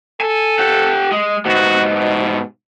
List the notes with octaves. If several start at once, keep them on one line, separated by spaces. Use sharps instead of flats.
A4 G#5
G4 F#5
G#3
G#2 B3 F#4
B2